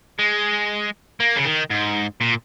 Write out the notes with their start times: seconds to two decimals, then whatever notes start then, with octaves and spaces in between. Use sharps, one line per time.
0.19 G#3
1.20 A#3
1.36 C#3
1.45 D#3
1.71 G#2
2.21 A#2